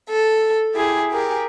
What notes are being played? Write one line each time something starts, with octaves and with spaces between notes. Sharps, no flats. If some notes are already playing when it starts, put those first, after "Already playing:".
A4
E4 G4 G#4
G4 G#4 A#4